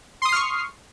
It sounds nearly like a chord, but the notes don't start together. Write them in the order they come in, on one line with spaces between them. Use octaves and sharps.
C6 D#6 C7 F6 C#6